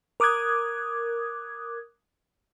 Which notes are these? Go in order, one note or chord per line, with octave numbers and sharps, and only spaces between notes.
A#4 D6 D#6 F#6 G#6